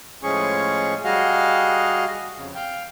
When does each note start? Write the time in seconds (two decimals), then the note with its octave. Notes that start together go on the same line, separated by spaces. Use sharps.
0.23 A2 F3 G#3 C#4 G#4 C#6
1.04 G3 F#4 G#4 D#5 F5
2.37 F2 C#3
2.55 F5 G5